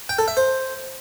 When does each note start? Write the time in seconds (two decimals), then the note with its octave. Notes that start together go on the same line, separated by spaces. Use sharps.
0.09 G5
0.19 A4
0.28 E5
0.37 C5